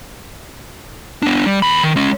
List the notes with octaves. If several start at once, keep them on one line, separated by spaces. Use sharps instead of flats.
B3 D4
G3
D#2 B5
D#3
G#3 C#4